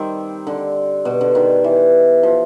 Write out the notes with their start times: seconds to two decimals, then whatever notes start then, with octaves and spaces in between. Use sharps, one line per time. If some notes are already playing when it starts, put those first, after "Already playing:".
Already playing: D#3 G3 C4
0.47 D3
1.05 B2
1.21 D3
1.35 D#3
1.64 E3
2.23 F3